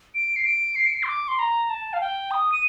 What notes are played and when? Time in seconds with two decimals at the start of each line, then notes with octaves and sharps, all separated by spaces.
0.15 D7
0.36 C7
0.45 D7
0.76 C7
0.86 D7
0.94 C7
1.03 C6
1.08 D6
1.28 C6
1.39 A#5
1.70 A5
1.93 F5
2.01 G5
2.31 D#6
2.52 D#7